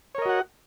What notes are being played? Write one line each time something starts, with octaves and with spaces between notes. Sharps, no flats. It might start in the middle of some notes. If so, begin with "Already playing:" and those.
F#4 A#4 C#5 D#5 F#5